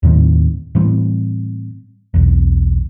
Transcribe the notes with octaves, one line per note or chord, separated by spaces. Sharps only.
D#2 A2 D#3 C4
A2 E3 G3 C4
B1 E2